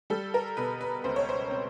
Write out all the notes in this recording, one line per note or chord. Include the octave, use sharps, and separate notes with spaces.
G3 A4
A#4
B2 B4
B4
C#2 C5
C#5
C5
C4